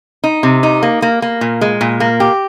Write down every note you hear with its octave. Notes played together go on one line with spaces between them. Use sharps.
D#4
C3
D#4
A#3
A#3
A#3
A#2
G#3
A#2
A#3
G4